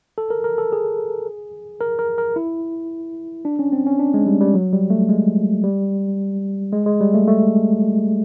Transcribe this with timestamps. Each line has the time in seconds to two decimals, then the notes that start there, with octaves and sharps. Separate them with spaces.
0.18 A4
0.30 A#4
0.44 A#4
0.58 A4
0.72 G#4
1.81 A#4
1.99 A#4
2.18 A#4
2.36 E4
3.45 D4
3.59 C#4
3.72 C4
3.86 C#4
4.00 D4
4.14 G#3
4.27 G3
4.41 G3
4.54 F#3
4.73 G3
4.90 A3
5.09 G#3
5.63 G3
6.72 G#3
6.86 G#3
7.01 G3
7.14 A3
7.28 A3